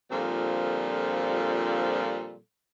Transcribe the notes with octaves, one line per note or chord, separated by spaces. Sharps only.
A#2 D3 F3 G3 C4 A4